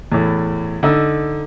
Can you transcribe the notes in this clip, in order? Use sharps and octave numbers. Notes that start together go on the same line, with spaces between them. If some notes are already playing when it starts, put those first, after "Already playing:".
E2 A2
D3 D#4 E6